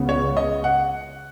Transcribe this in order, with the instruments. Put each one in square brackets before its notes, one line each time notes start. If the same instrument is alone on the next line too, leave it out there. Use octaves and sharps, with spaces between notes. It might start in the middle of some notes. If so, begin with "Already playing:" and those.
Already playing: [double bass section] C#2 C#3 B3
[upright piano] C#5
D#5
F#5